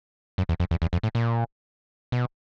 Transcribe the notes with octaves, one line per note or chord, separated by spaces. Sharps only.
F#2
E2
F2
E2
E2
F2
A2
A#2
B2